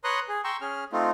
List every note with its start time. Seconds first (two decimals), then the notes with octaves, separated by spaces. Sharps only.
0.04 B4 C#5 A#5 C6 D#6 F#6
0.29 G#4
0.44 G5 A#5 C6 C#6 E6
0.61 C#4 G#4 F6
0.92 A3 C4 D#4 F4